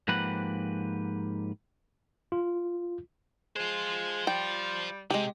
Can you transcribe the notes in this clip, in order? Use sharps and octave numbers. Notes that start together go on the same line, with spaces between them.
G#2 F3 A#3 G4 B4 F#5
F4
G#3 F4 C5
G3 G5
C3 G#3 G4